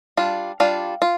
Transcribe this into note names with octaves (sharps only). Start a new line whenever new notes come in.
G3 D4 F4
G3 D4 F4 F5
F4